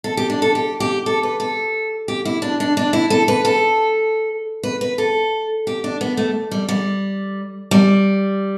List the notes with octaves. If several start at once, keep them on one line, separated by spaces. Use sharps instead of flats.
A4
G4
D4
A4
G4
G4
A4
B4
A4
G4
E4
D4
D4
D4
E4
A4
B4
A4
B4
B4
A4
G4
D4
B3
A3
G3
G3
G3